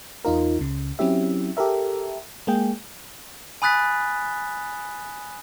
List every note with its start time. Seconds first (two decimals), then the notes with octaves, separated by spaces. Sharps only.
0.25 E2 D#4 F4 A#4
0.59 C#2 C#3
0.99 F#3 C4 C#4 E4 G4 E5
1.57 G4 A4 A#4 E5
2.47 G#3 A#3 G#4 G5
3.62 G#5 B5 D#6 F#6 A6 B6